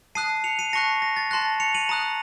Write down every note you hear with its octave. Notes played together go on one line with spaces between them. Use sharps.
A5 D#6 F#6 C7 D#7
C#7 F7
C7 D#7
A5 C#6 F#6 A#6 C#7
A#6
A6
A5 C6 F#6 A#6
C#7 F7
D#7 F#7
A#5 D#6 F#6